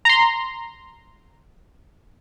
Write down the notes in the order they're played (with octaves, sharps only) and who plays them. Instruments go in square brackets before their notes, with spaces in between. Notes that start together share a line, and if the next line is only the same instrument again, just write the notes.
[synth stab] A#5 C6